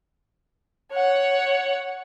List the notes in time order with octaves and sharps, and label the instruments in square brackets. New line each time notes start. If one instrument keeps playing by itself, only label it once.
[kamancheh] C#5 F#5